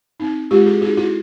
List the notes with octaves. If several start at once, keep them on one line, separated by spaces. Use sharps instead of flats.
C4 D#4
G#3 F4 G4
F#4 G#4
C4 D#4 F#4 G#4
E4 F#4